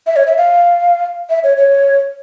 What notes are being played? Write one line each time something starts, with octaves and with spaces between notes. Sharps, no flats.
E5
C#5
E5
F5
E5
C#5
C#5